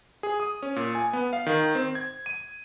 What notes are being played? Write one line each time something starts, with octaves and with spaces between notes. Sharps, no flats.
G#4
D#6
C#4
A#2
G#5
B3
F5
D#3
C4
G#6
D#7